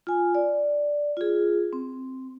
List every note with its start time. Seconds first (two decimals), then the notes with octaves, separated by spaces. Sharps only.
0.07 F4 G#5
0.35 D5
1.17 F4 G#4
1.73 C4